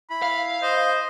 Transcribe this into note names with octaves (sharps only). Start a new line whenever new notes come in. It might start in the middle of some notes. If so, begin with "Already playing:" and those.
E4 B5
F5
C5 D#5